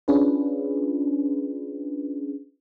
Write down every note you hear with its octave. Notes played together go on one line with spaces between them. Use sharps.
C#4 D4 F4 G#4 B4